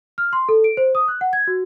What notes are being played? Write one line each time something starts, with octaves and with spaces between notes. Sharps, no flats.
F6
C6
A4
D7
C5
D#6
F#6
F#5
G#6
F#4